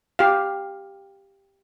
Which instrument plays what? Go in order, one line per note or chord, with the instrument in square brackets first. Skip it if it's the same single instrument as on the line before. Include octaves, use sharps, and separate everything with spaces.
[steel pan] G4 F5